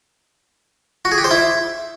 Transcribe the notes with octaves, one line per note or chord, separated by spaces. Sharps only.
F#4
G#4
G4
C5
E4